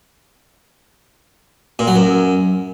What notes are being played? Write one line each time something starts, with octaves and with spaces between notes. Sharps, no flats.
A#2
F#3
F#2